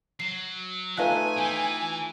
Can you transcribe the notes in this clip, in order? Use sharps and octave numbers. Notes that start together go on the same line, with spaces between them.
F#3 C7
F3 A3 D#4 B4 F5 G#5 F#6
E3 G5 B5